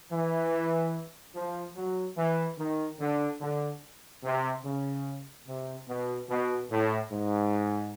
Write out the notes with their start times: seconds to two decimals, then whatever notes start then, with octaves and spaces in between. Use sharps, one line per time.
0.12 E3
1.35 F3
1.76 F#3
2.17 E3
2.58 D#3
3.00 D3
3.41 D3
4.24 C3
4.65 C#3
5.47 C3
5.88 B2
6.29 B2
6.71 A2
7.12 G#2